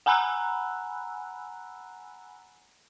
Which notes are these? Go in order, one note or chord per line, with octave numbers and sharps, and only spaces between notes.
F#5 G#5 A#5 B5 E6 F#6